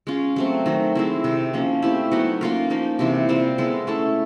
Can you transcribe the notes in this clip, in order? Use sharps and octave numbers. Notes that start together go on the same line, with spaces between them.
G#3 C#4 F4
F#3 A3 C4
D#3 F#3 A3
G#3 C4 E4
C3 D#3 G#3
F3 A#3 C#4
A3 C4 E4 G4
F#3 B3 D#4 F#4
A#3 C#4 F4 A#4
F3 A#3 D#4
C3 E3 G#3 C4
G3 C4 F4 A#4
G#3 B3 E4 A4
A3 C#4 E4 A4